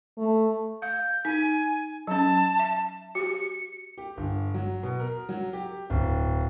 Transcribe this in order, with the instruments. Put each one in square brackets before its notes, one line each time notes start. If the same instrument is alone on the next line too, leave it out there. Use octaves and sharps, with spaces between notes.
[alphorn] A3
[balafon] F5 [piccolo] G6
[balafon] D#4 [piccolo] G#5
[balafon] F#3 C#4 [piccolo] A5
[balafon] E5
[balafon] F#4 G4 [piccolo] C#7
[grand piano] G4
G1
F#3
B2
A#4
F#3
G4
D1